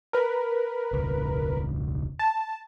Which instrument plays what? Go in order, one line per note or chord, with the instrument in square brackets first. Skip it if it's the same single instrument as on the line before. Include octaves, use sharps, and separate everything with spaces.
[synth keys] A#4 B4
[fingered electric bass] E1 C#2
[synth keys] A5